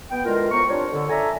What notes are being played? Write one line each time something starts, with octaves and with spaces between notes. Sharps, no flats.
B3 G5
D3 E3 G#3 F4 A#4
A2 F3 B3 A#5 C#6
G3 C4 D4 F4 C5 C#5
D3
D4 A4 D5 E5 G#5 A#5